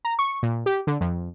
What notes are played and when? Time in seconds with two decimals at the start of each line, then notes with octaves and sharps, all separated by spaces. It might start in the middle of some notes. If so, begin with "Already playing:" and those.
0.05 A#5
0.19 C#6
0.43 A#2
0.66 G4
0.87 D3
1.01 F2